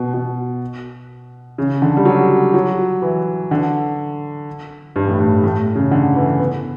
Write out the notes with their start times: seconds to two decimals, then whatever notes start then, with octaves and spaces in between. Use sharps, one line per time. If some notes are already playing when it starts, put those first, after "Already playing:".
Already playing: B2
0.14 B2
1.58 C#3
1.82 D3
1.97 G3
2.05 F#3
2.54 F#3
3.02 E3
3.51 D3
4.96 G2
5.08 A2
5.19 G2
5.44 A2
5.75 C#3
5.91 D3
6.16 E3
6.39 B3